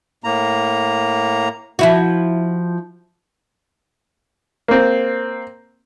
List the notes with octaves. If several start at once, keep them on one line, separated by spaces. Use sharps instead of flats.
A2 A#3 A#5
F3 E4 F#4
A#3 C4